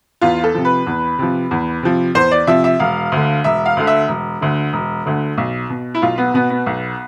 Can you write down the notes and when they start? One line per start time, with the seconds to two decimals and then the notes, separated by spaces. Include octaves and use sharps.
0.21 E2 F4
0.44 A4
0.55 C3 F3
0.65 B4
0.86 E2
1.18 C3 F3
1.51 E2
1.83 C3 F3
2.15 E2 C5
2.31 D5
2.47 C3 F3 E5
2.64 E5
2.80 E1 F5
3.12 D2 D3
3.44 E1 E5
3.66 F5
3.77 D2 D3
3.87 E5
4.08 E1
4.41 D2 D3
4.73 E1
5.06 D2 D3
5.38 B1
5.70 B2
5.95 E4
6.02 B1 F4
6.18 B3
6.34 B2 B3
6.50 B3
6.66 B1